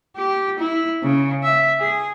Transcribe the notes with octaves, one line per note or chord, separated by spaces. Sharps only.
G4
E4
C#3
E5
G#4